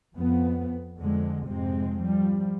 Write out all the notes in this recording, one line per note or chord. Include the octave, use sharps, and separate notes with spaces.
F2 F3 B3
F2 D3 G#3
F2 G#2 C3 G#3 C4
F3 G3